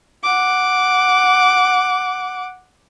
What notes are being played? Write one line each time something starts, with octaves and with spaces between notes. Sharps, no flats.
F#5 D6